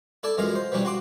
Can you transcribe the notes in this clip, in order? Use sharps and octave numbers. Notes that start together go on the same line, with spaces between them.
E4 A4 D5 A5
F#2 E3 G#3 F4 F5
C5
E3 F3 G3 C#4 D4
F#4 C6 D6